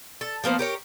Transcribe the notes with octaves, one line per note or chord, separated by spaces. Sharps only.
A4
F3 A#3 B3 C5
G4 A#4 C#5